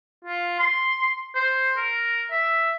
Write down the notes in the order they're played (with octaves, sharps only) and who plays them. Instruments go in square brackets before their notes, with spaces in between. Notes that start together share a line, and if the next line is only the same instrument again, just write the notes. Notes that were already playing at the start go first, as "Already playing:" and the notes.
[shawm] F4
C6
C5
A#4
E5